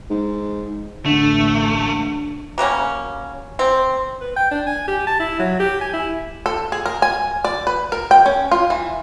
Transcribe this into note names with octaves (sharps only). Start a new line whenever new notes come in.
G#2
A1 A2 D3 A3
F#3 G3 A#3 C#4
C4
B4
G5
D4
G#5
G4
A5
E4
F#3
G4
G#5
E4
A4
G#4
A#4
G#5
D5
B4
A#4
G5
C#4
F4
E3